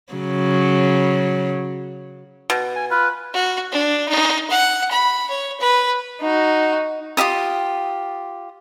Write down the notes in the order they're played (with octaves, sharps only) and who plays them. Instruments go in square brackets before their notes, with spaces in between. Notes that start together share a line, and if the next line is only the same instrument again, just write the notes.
[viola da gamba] C#3 F#3
[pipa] B2
[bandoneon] G#5
[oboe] F4 [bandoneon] B4 [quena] B5
[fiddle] F#4
D4
D#4
F#5
B5
C#5
B4
[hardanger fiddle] D#4 F#4
[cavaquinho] F4 G4 E5 D#6